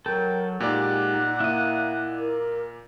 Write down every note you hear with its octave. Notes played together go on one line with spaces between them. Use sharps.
F#3 A4 A#4 G5
A#2 G#3 D#4 G4 D5 F#5
A#3 E4 D#5
A#4